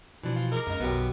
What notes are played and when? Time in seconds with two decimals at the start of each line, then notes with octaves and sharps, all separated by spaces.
0.23 B2 E3 F3 D4
0.36 F4
0.52 D#4 G#4 A#4 D6
0.67 C#2 F#2 A#3 D#4 A#5
0.80 B1 F#2 B2 B3 G4
0.92 B1